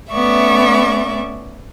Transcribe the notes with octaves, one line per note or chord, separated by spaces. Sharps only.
A3 B3 C#4 D5 E5 C#6